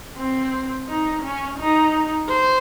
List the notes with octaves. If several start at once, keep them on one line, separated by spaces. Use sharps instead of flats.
C4
D#4
C#4
D#4
C5